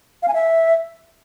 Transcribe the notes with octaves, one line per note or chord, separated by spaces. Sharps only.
F5
G#5
E5